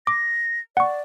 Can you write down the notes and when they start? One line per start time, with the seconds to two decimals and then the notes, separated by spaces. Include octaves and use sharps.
0.07 D6 A#6
0.77 D5 F#5 C#6